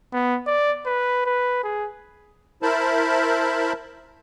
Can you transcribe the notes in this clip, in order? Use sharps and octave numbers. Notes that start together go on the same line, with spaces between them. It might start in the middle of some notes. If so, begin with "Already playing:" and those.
B3
D5
B4
B4
G#4
E4 A#4 C5 E5 A5 B5